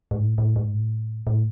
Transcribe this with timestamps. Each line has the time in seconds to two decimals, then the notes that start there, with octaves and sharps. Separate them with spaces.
0.11 G#2
0.20 A2
0.38 A2
0.56 G#2
0.74 A2
1.27 A2